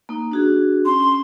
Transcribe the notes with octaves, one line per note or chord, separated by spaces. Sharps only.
A#3 D#4
D4 F#4 G#4
C#4 C6